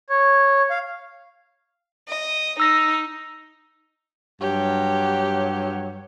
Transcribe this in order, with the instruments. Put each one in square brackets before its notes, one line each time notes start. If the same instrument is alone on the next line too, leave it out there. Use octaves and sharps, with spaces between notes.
[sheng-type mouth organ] C#5
F5
[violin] D#5
[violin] D#4 [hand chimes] E6 A#6
[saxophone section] G2 F#3 C#5 [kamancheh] G4